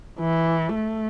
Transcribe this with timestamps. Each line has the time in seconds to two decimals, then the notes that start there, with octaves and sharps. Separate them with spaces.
0.20 E3
0.76 A3